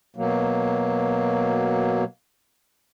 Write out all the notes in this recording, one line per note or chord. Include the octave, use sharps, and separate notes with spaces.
B2 F#3 A#3